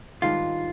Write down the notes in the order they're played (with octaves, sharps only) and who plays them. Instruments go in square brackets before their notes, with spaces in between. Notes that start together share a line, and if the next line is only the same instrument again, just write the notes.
[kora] G#2 D#3 G3 D4 [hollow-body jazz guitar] F4